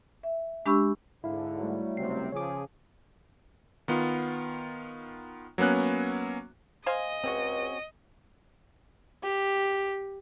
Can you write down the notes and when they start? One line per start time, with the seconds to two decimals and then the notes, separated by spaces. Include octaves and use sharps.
0.23 E5
0.66 G#3 D4 G4 B5 C#6 E6
1.24 G#2 D3 E4 F5
1.59 F#3 G3 A3
1.97 F#1 C3 C4 C7
2.32 C#3 F3 G#4 C#5 D6
3.88 D#3 B3 F4
5.58 F#3 A#3 B3 C#4 F#6
6.86 C5 D#5 F5 G#5
7.24 C#2 C4 C#4 F#4
9.23 G4